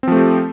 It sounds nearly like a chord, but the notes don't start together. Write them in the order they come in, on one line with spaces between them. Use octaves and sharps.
C4 F3 A3 G4